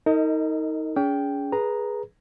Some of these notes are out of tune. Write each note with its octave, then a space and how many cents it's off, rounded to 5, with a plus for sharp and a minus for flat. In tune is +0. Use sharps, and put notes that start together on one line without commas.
D#4 +25 A#4 -40 D#5 +0
C#4 +40 G#4 +0 G5 +0
G#4 +0 B4 -15 A#5 +0